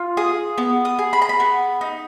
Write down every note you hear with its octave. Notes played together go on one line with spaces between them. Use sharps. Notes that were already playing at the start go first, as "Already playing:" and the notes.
Already playing: F4
G#4 D#6
B3
D#6
G#4
B5
A#5
B5
B3
D#4